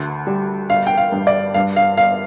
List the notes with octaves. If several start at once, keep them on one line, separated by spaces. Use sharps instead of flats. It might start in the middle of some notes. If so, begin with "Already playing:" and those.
Already playing: D2 D3
G3
G1 F5
G5
F5
G2
D5
G2 F5
F5
G1 F5